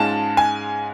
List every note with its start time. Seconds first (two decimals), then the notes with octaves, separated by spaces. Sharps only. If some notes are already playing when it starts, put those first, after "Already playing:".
Already playing: G#2 G#3 C#4 F4 A5
0.37 G#5